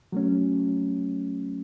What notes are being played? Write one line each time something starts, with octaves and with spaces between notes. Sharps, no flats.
F#3 A3 C#4